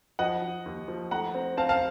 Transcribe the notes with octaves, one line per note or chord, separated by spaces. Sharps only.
F3 D#5 F#5
F3
D#2
F3
A3 F#5 A#5
C4
C4 F5 A5
F5 A5